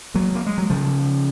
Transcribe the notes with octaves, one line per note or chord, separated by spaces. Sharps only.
F#3 A#3
A#3
G#3
F#3
C#3 F3